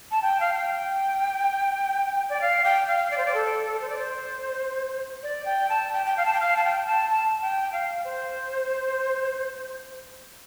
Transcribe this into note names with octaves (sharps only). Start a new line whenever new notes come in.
A5
G5
F5
G5
D5
F5
G5
F5
D5
C5
D5
A4
C5
D5
C5
D5
G5
A5
G5
G5
F5
A5
G5
F5
A5
G5
A5
A5
G5
F5
C5